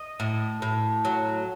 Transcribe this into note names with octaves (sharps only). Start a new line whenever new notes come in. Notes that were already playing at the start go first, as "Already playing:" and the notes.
Already playing: D#5
A2
A2
F#3